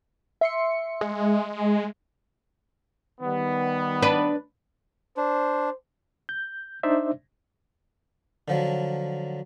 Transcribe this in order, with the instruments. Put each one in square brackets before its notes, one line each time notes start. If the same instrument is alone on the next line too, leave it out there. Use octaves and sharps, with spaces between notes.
[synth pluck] E5 C6 C#7
[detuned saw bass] G#3
[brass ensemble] D#3 G3 B3
[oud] D4 B4
[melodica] D4 [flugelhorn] C5
[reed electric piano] G6
D4 D#4 C5 D5 E5
[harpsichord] D3 F3 F#3